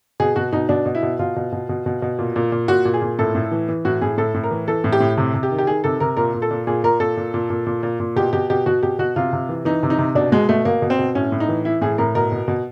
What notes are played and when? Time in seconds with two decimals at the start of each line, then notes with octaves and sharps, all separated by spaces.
0.20 B2 G#4
0.36 B2 F#4
0.53 B2 D#4
0.69 B2 D4
0.86 B2
0.95 E4
1.03 B2
1.19 B2 F4
1.36 B2
1.52 B2
1.69 B2
1.86 B2
2.02 B2
2.19 A#2
2.36 A#2
2.52 A#2
2.68 A#2 F#4
2.85 A#2
2.94 G#4
3.02 A#2
3.19 A2 A4
3.35 A2
3.52 E3
3.69 E3
3.85 A2 F#4
4.01 A2 G#4
4.17 A2 A4
4.34 A2
4.43 A#4
4.51 E3
4.68 E3 A4
4.84 A2
4.93 G4
5.00 A2
5.17 C3
5.34 C3
5.43 G4
5.51 D#3
5.59 G4
5.67 D#3 G#4
5.84 C3 A4
6.00 C3 A#4
6.17 A#2 A#4
6.34 A#2
6.42 A4
6.51 A#2
6.67 A#2 G#4
6.84 A#2 A#4
7.00 A#2 A4
7.17 A#2
7.34 A#2
7.50 A#2
7.67 A#2
7.83 A#2
8.00 A#2
8.16 B2 G4
8.33 B2 G4
8.50 B2 G4
8.66 B2 F#4
8.83 B2 G4
8.99 B2 F#4
9.16 C3 F4
9.33 C3
9.49 E3
9.65 E3 D#4
9.83 C3
9.90 D#4
9.98 C3
10.15 B2 D4
10.32 B2 G#3
10.49 B2 A3
10.65 B2 A#3
10.82 B2
10.90 C4
10.99 B2
11.15 A2 C#4
11.32 A2
11.40 D#4
11.48 E3
11.65 E3 E4
11.81 A2 G#4
11.98 A2 A#4
12.15 B2 A#4
12.32 B2
12.48 B2